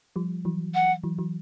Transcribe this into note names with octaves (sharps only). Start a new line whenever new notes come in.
F3 G3
E3 F#3
F#5
E3 F#3
E3 F#3